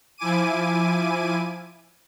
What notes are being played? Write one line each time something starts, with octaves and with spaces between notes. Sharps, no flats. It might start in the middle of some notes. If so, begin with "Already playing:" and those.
F3 E4 G#5 D6 D#7